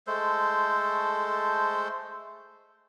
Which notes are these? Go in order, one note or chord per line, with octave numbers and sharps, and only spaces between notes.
G#3 A3 A4 C5